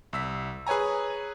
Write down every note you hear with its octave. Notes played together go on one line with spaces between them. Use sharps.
C2 E6 B6
G#4 B4 C#5 G#5 A#5